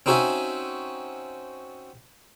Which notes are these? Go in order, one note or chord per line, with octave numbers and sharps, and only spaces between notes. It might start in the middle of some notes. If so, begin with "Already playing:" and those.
C4 C#4 D#4 F#4 E5 G#5